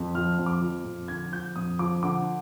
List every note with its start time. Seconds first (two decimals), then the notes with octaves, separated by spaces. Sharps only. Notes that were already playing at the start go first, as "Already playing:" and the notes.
Already playing: F2
0.15 F3 F6
0.38 F2
0.46 D6
0.61 F3
0.85 F2
1.08 D3 G#6
1.32 F3 G6
1.56 F2 D#6
1.79 F3 D6
2.03 D3 D6